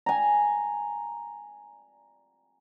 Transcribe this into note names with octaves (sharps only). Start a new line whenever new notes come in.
G#5 A#5